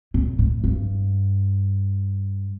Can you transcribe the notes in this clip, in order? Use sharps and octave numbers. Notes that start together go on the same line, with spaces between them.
A#2
A2
G2